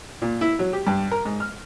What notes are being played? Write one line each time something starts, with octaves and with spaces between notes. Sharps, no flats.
A#2
E4
F#3
G4
G2
A#4
G#2
F6